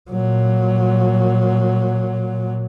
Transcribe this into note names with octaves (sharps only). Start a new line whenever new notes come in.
A#2 F#3